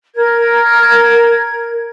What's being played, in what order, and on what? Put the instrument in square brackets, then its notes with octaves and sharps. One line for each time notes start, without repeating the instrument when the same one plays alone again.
[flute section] A#4 G#6